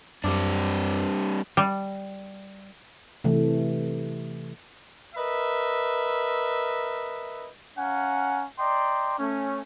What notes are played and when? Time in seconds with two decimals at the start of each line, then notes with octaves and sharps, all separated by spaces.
0.24 F#2 G3 C4 D4 D6 E6
1.57 G3
3.24 C3 E3 A3
5.16 A#4 B4 D#5 E5
7.78 C#4 F5 F#5 G#5 A#5
8.59 D5 D#5 G5 A#5 C6
9.19 A3 C#4